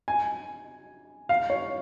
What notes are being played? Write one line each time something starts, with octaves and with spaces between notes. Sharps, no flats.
G#5
F5
C#5